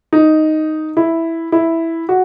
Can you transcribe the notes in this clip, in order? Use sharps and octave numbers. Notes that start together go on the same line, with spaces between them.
D#4
E4
E4
F#4